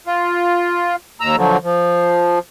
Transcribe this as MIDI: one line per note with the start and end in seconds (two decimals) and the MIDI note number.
0.06 0.96 65
1.21 1.36 39
1.21 1.36 82
1.21 1.36 88
1.36 1.57 50
1.36 1.57 53
1.36 1.57 54
1.63 2.39 53